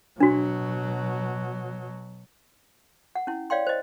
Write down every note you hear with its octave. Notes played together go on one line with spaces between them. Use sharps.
B2 F#3 D4 F#4
F#5
C#4 E4
C#5 D5 F5 G5 C6
C5 D#5